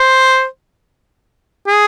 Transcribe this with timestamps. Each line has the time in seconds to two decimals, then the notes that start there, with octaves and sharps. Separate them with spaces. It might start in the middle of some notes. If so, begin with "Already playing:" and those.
Already playing: C5
1.67 G#4